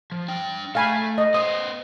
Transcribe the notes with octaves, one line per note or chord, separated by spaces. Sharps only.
F3
D4 G5
A3 A4 F5 G#5 B5
D#5
B3 C5 D#6